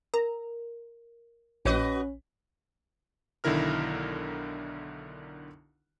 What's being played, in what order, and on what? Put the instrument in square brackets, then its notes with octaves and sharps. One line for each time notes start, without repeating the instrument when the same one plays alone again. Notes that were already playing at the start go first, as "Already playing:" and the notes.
[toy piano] A#4 [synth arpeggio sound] A#5
[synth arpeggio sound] A#1 C#5 [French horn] C#4 [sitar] F#4 B4 D#5
[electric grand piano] B1 D3 D#3 E4 A#4 F6